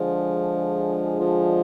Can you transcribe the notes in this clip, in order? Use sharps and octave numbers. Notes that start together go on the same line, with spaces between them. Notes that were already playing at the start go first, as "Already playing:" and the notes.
Already playing: D3 F3 G#3 D4 F4 G#4
F3